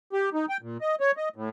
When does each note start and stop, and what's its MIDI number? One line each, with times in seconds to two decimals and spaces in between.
0.13 0.30 67
0.34 0.46 63
0.49 0.57 79
0.62 0.78 46
0.81 0.95 75
1.00 1.12 73
1.17 1.29 75
1.36 1.49 45